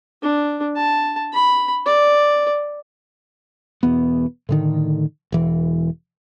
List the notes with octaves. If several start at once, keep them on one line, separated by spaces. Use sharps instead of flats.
D4
A5
B5
D5
E1 E2 B3
A2 D3 D#3
E1 E3